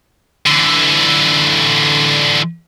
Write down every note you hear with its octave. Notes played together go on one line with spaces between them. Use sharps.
D3 E3